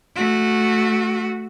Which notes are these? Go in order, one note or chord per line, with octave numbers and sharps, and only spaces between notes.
A3 F#4